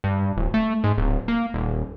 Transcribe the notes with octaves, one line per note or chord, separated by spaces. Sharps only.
G2
D1
A3
G#2
D1
A#3
D#1